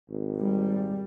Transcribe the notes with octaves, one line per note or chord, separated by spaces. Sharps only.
G#1
G3